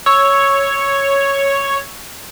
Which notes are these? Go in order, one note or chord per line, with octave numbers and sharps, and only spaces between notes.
C#5 C#6 E6